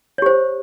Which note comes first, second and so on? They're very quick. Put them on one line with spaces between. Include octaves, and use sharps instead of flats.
C#5 G4 C5